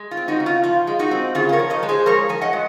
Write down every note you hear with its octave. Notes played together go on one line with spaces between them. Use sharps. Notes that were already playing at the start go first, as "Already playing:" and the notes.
Already playing: G#3
F4
C4
D#4 F#4
C#3
F4
F3 F4
G#3
D#4 F#4
C4
C#3 F4 G#4
C5
A#4 C#5
F3
C5 D#5
G#3
G#4 C5
F3 A#4 C#5
F3 G#5
D#5 F#5
G#3